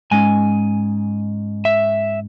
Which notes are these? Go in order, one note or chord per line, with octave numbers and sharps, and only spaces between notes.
G#2 G#3 C#4 G#5
E5